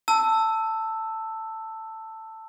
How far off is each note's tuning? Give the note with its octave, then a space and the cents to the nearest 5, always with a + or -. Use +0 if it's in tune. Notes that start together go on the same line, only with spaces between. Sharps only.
A5 +15 E6 +0